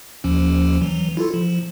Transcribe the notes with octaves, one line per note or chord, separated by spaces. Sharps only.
D#2 F3 C#4
E3 F#3
E4 F4 A4
F3